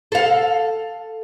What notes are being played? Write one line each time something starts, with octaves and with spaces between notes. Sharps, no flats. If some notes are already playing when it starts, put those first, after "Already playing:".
A4 F5